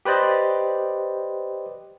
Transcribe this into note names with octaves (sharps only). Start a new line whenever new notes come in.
G4 B4 C5 D5 D#5